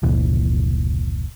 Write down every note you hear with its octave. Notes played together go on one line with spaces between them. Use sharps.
F1 C#2 A#2 E3